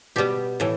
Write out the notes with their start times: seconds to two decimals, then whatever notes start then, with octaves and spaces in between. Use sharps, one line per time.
0.16 B2 G3 B3 G4
0.60 A2 E3